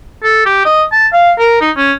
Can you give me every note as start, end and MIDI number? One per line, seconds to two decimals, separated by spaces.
0.23 0.42 69
0.46 0.60 67
0.65 0.83 75
0.92 1.07 81
1.13 1.31 77
1.39 1.59 70
1.61 1.70 63
1.76 1.92 61